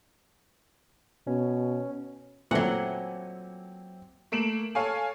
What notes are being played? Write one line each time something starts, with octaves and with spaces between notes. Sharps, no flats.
B2 C#4
A#2 E3 F#3 A3 C4 E5 F#5
A3 A#3 D7 E7 F#7
A4 C#5 F5 G#5